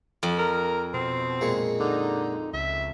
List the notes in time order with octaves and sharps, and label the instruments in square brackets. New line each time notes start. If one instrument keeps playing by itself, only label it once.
[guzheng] F2
[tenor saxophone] A#4
[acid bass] B2 [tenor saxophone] C4
[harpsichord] A#2 G#3 C#6
[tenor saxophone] D3 [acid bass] D#4
[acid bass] C#2 [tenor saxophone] E5